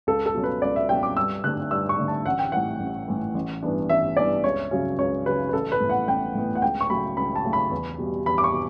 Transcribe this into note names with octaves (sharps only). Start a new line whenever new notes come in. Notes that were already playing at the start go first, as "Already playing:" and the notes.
C#2 A4
A4
B2 F#3 C#4
B4
C#2 D5
E5
B2 F#3 C#4 G5
D6
G2 E6
D3 A3 D4 F#6
G2 E6
C#6
D3 A3 D4
A5
A1 F#5
G5
A2 E3 F#5
A1
A2 E3
A1
G2 E3 B3 D4
A1 E5
G2 E3 B3 D4 D5
C#2 C#5
C#3 F#3 C#4
C#2 C#5
C#3 F#3 C#4 B4
B4
A1 A4
B4
A2 E3 B3
F#5
A1 G5
A2 E3 B3
F#5
C#2 G5
C#6
C#3 F#3 A3 B5
C#2 B5
A5
C#3 F#3 A3
B5
E2
B2 G3
E2 B5
D6
C#6
B2